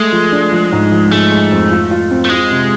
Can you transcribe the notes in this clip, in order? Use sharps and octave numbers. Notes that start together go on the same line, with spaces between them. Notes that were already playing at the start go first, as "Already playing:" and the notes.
Already playing: G#3 A3
F3
D4
F3
G#2
F3
G#3 A3
G#3
F2
F4
F4
C4
A3
G#3 F4
C3